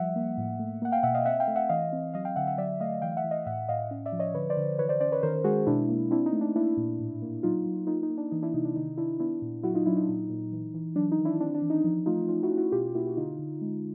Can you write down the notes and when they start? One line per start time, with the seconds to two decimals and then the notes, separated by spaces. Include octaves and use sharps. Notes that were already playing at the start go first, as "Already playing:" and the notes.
Already playing: F3 G3 E5 F#5
0.16 A#3
0.37 A2
0.59 A3
0.82 A#3 F#5
0.92 F5 G5
1.03 B2 E5 F#5
1.15 D#5 F5
1.25 C4 E5 F#5
1.40 F5 G5
1.47 A3
1.56 E5 F#5
1.69 E3 D#5 F5
1.93 C4
2.14 F#3 D#5 F5
2.25 F5 G5
2.36 D3 E5 F#5
2.47 E5 F#5
2.58 F#3 D5 E5
2.80 A3 D#5 F5
3.02 E3 F5 G5
3.12 F5
3.17 E5 F#5
3.24 E3
3.31 D#5 F5
3.46 A2 E5 F#5
3.69 A2 D#5 F5
3.91 C#4
4.05 D5 E5
4.12 F3
4.19 C#5 D#5
4.34 D3 B4 C#5
4.50 C5 D5
4.57 D3
4.79 E3 B4 C#5
4.89 C5 D5
5.00 C#4 C5 D5
5.12 B4 C#5
5.23 D#3 A#4 C5
5.44 G#3 F#4 G#4
5.66 B2 D4 E4
5.89 A#3
6.11 C4 D4 E4
6.26 D#4
6.33 A3
6.41 D4
6.55 A#3 D4 E4
6.77 A#2
6.99 A2
7.22 A#3
7.43 F#3 D#4 F4
7.66 F#3
7.87 A#3 D#4 F4
8.03 D#4
8.10 A#3
8.18 D4
8.32 E3 D#4
8.42 D4 E4
8.54 C3 D#4
8.65 D4
8.76 D#3 D#4
8.98 D#3 D4 E4
9.20 B3 D4 E4
9.42 A#2
9.63 F#3 E4 F#4
9.74 D#4 F4
9.86 F#3 D4 E4
9.97 D#4
10.09 A#2
10.30 A#2
10.52 E3
10.74 E3
10.96 F#3 D4
11.12 D#4
11.19 D#3
11.25 D4 E4
11.40 C4 D4
11.55 D4
11.62 E3
11.70 D#4
11.84 F3 D#4
12.06 A3 D#4 F4
12.28 C#4 D#4 F4
12.43 E4 F#4
12.51 C#4
12.57 E4 F#4
12.72 B2 F4 G4
12.95 A#3 E4 F#4
13.07 F#4
13.17 D3 D#4 F4
13.39 D3
13.61 G#3